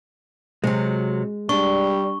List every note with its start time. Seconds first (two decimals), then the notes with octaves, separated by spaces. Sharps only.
0.64 C3 F#3 G#3
1.49 G3 D4 C#6